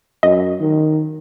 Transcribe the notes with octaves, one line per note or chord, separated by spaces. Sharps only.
F#2 D#5
D#3